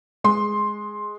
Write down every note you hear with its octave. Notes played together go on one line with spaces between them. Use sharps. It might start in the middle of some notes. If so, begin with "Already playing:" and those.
G#3 C6